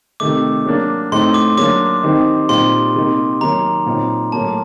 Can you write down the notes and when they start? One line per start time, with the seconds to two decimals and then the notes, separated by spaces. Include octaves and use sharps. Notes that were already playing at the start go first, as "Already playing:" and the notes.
0.20 C3 D#3 A3 D6
0.66 F#3 A#3 D4
1.12 A2 A3 C4 D#4 C6
1.34 D6
1.57 F#3 A#3 D4 D6
2.03 D#3 G3 C4 D#4
2.49 A#2 G3 C4 D#4 C6
2.95 C3 G3 A#3 D#4
3.41 D#3 F#3 A#3 D#4 A#5
3.86 A#2 F#3 C4 D#4
4.32 A2 F#3 A#3 A5